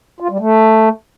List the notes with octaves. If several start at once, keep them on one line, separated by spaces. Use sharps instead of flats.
F4
G3
A3